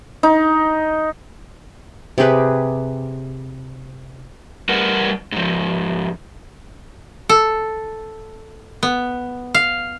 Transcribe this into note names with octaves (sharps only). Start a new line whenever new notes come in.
D#4
C3 G4 G#4 B4
G3 A#4 B4 F#5
G#2 F3
A4
B3
F5